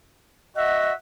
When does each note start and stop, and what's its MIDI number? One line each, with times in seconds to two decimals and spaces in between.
0.56 0.93 66
0.56 0.92 75
0.56 0.93 76
0.56 0.93 78